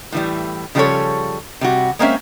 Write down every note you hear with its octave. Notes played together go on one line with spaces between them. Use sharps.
A2 E3 G3
C#3 F3 G3 E4 A4 C#5
C3 G3 F#4
G#3 A#3 C4 C#4 E5